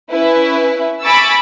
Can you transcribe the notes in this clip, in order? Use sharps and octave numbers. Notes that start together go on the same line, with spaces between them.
C#4 E4 B4
G#5 B5 C#6 D6 E6 A6